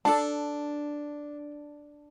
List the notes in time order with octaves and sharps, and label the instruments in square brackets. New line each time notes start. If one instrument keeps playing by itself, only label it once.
[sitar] D4 [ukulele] A4 A5